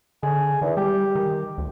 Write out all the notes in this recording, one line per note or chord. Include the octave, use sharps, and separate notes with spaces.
D3 G#4
E2 D#3
G3 G4
D#3
D2